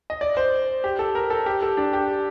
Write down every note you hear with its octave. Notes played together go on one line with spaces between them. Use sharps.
D#5
D5
C5
G4
A4
A#4
A4
G4
A4
D4
G4